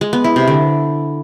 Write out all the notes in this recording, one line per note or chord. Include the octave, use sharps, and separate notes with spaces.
G#3
B3
E4
C3
D3